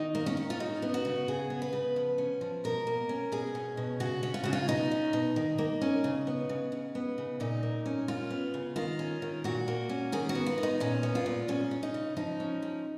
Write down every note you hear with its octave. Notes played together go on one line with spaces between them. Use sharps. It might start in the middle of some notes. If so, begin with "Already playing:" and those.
Already playing: D#3 D#4
A#3
C#4
C#4
F4
C#3 D#4
B3
F#4
C#3
C#3 G#4
B3
B4
C#3
F3
C#4
F3
B2 A#4
A#3
C#4
B2 G#4
C#4
B2
C#3 F#4
C#4
F4
C#3 F#4
F4
B2 D#4
C#4
B2
D#3
A#3
C#4
C#3
B3
C#3
C#3
B3
C#3
A#2 D#4
A#3
C#4
C#3 F4
B3
C#3
D#3 F4
C#4
D#3
A#2 F#4
A#3
C#4
D#3 G#4
F#4
B3
F4
D#3
D#4
A#2 C#4
B3
F4
A#2
C#3 C#4
C#4
D#4
C#3
F3 D#4
C#4
F3